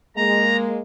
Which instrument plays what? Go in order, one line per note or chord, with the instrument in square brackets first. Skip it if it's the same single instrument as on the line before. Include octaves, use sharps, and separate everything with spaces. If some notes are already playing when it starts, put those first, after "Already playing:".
[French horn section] G#3 A#3 [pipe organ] A#5